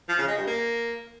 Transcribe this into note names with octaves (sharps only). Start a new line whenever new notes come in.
F3
C#3
G#3
G2
A#3